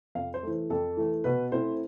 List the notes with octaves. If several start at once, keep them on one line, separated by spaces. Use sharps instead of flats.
F2 F5
C5
E3 A3
F2 A4
E3 A3
B2 B4
A3 C4 E4 C5